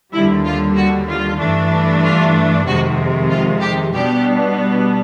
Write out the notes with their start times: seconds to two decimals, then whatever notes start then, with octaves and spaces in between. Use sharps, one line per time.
0.14 D#2 D3 G3 E4
0.46 F4
0.77 F#4
1.09 F4
1.40 G2 E3 A3 D4
2.03 F4
2.67 F2 C3 D#3 G#3 F#4
3.30 F4
3.60 G4
3.93 B2 G3 B3 D4 G4